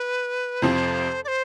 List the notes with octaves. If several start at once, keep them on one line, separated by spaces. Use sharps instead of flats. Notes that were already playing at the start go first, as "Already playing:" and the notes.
Already playing: B4
F2 C3 F3 C4 C5
D5
C5